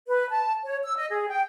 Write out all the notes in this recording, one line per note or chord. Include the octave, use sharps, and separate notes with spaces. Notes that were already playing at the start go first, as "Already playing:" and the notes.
B4
A5
C#5
E6
D#5
G#4
G5